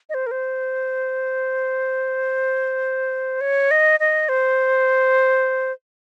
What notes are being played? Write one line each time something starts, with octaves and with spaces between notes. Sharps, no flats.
D#5
C5
A#4
C5
C#5
D#5
D#5
C5